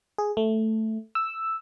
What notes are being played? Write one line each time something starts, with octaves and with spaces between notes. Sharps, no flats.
G#4
A3
E6